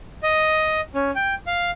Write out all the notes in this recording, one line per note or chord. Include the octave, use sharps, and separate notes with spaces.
D#5
C#4
G5
F5